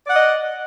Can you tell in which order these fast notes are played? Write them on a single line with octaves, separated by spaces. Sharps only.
D5 F#5 D#5